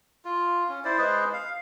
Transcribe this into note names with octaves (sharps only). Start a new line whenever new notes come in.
F4
C#4
E4 C5 D5
G#3 G#4 B4 C5
F5